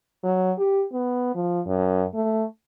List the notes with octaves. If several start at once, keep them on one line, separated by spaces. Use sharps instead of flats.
F#3
G4
B3
F3
F#2
A3